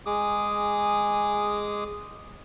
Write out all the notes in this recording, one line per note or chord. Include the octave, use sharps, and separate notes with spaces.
G#3 G#4 D6 D#6